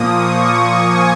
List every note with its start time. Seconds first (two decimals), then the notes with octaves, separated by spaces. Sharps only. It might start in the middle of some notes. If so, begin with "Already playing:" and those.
Already playing: A#2 F3 A#3 D#6
0.13 C#6
0.74 G#5